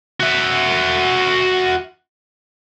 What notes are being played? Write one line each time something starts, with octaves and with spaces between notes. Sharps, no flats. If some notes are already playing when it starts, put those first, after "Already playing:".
F#4 E5